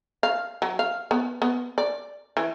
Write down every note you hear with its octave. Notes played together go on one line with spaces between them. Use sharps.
F5
F#3
F5
B3
B3
D5
E3